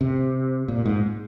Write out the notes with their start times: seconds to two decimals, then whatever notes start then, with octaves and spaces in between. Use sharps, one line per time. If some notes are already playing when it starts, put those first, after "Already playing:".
0.01 C3
0.68 A#2
0.86 G#2